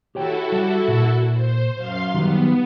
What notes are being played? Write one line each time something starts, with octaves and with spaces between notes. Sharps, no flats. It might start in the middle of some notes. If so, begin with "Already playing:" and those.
E4 F#4 G4 A4 C#5 G5
G3
A#2
C5
F#2 F5 C6
D#3 F#3 G3 B3